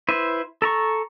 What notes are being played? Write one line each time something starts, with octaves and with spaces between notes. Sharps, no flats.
E4 B4 C5
A4 A#5 C#6